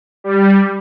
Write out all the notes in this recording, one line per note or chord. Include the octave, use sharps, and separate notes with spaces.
G3